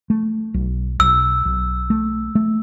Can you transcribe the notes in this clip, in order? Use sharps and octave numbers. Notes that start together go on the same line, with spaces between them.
A3
B1
B1 E6
B1
A3
A3